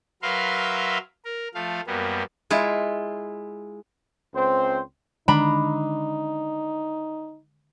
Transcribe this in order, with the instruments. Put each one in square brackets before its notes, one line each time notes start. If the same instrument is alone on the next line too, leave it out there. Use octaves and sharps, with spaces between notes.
[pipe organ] F#3 A#4 B4 E5 F5 C6
A#4
F3 A3 F5
F#2 G3 A#3 B3
[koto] G#3 E4 F4
[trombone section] C#2 C4 C5
[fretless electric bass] D3 D#3 G#3 [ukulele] D4 A#5 B5 [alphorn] D#4